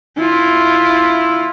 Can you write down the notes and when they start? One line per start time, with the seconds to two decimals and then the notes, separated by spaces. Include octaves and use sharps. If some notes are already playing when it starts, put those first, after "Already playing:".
0.17 E4 F4